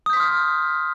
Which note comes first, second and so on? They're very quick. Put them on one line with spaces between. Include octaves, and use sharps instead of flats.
D#6 G6 B6 C6 F6